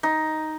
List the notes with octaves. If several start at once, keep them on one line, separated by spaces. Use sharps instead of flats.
D#4